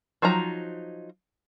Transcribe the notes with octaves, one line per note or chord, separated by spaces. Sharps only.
F3 F#3 D#4 A#5